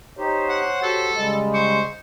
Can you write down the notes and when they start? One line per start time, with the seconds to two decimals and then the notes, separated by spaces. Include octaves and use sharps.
0.18 D#4 G4 C5 C#5
0.49 F#5
0.83 F#4 G4 A4
1.16 C#3 G3 G#3 D#5
1.53 C5 C#6